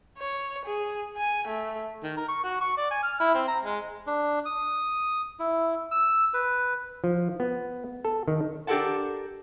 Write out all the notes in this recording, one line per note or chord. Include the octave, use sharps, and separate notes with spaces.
C#5
G#4
G#5
A3
D#3
A#4
C#6
F#4
C#6
D5
G#5
F6
E4
C4
A#5
G#3
D4
D#6
E4
E6
B4
F3
B3
A4
D#3
D4 G4 A4 A#4 F#5 A5